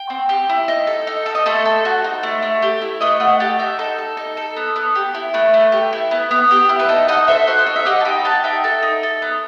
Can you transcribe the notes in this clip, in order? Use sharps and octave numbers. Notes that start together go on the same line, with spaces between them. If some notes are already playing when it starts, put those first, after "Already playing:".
Already playing: G5
C4
G4
E4
D#4
A4
D#4
A4
D#5
A3 A4 C5
A4
F#4
D#4
A3
A3
G4
E4
A3 B4 D#5
A3 D#5 F#5
G4 F#5 A5
D#4 E5 G5
D#4 A4
A4
D#4
A4
B3
B3
G4
E4
A3 B4
A3
G4
E4
B3
B3
G4
E4
B4
D#4 A4
D#4 D#5 F#5
A4 C5 E5
F#4 A4 C5
D#4
E5
G4 D#5 F#5
A5
D#4 G5 B5
G4 F#5 A5
D#4 E5 G5
A4
D#4
A4
B3